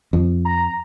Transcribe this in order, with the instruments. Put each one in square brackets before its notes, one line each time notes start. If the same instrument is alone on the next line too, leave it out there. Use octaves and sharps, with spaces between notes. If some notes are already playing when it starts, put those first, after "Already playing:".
[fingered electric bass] F2
[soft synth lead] A#5